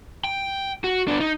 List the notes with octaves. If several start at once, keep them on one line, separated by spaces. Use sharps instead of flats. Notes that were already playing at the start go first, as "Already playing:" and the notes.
G5
F#4
B3 D4
D#4